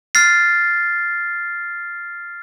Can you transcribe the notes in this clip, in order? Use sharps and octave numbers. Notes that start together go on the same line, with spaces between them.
F6 A6 C7